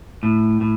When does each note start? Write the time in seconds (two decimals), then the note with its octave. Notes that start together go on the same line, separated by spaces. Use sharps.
0.23 A2
0.61 A2